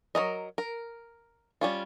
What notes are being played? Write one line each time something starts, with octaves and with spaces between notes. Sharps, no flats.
F#3 A#3 A#4 D#5
A#4
G3 C#4 F4